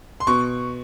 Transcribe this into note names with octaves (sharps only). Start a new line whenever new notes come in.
C6
B2 C#6